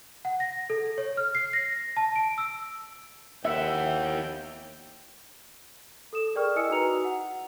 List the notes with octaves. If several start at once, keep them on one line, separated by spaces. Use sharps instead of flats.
F#5
A#6
A4
C#5
F6
C7
A#6
A5
D7
E6
D#2 E4 E5 F#5 G5
A4 D#6 E7
G#4 A#4 D5 G5 C#6 F6
E4 D#5 G#5 D#6 E6 C#7
D#4 F#4 B4 A#5 F7
F#5